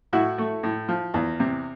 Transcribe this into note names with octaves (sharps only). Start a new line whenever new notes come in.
A2 E4 F#4
A3
A2
F3
E2
C3